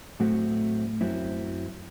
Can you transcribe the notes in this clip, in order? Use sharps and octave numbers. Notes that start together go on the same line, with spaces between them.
A2 F#3 A3 C4 F#4
F#2 F#3 C4 E4